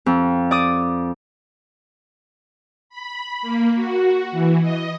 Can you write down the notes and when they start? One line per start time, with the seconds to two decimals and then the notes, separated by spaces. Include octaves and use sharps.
0.06 F2
0.51 D5 D6 D#6
2.90 B5
3.42 A#3
3.75 F#4
4.32 E3
4.61 D#5